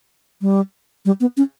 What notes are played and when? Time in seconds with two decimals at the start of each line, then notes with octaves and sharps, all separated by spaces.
0.41 G3
1.05 G3
1.20 B3
1.37 C#4